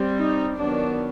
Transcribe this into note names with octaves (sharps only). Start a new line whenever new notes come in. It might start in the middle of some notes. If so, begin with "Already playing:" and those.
Already playing: G3 C4
D#4
D#3 F#3 B3 D4